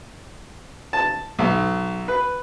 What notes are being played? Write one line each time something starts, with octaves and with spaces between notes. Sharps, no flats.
A5
B1
B4